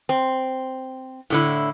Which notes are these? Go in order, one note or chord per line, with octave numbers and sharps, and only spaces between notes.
C4
A2 D3 E4